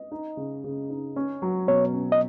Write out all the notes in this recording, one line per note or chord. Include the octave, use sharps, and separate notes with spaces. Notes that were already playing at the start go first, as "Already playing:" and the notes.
Already playing: D#5
D#4
C#3
C#3
D#4
C#4
F#3
B2 C#5
C#4
D#5